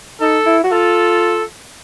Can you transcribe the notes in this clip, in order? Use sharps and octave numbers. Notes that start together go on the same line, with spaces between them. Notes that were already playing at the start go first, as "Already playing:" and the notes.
D#4 A4
E4
F#4
F4 A4